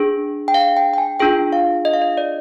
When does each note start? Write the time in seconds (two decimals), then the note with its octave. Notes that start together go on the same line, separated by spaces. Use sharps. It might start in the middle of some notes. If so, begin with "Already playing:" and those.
Already playing: D4 G#4
0.48 G5
0.54 F5
0.77 G5
0.94 G5
0.98 G#5
1.20 D4 F4 G#4 G5
1.53 F5
1.85 D#5
1.94 F5
2.02 D#5
2.17 D5